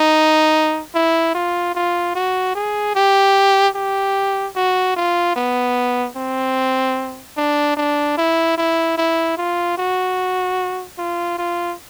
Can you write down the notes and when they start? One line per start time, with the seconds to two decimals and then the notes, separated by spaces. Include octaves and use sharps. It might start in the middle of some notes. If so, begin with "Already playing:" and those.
Already playing: D#4
0.95 E4
1.35 F4
1.75 F4
2.15 F#4
2.55 G#4
2.95 G4
3.75 G4
4.56 F#4
4.96 F4
5.36 B3
6.16 C4
7.37 D4
7.77 D4
8.18 E4
8.58 E4
8.98 E4
9.38 F4
9.78 F#4
10.98 F4
11.38 F4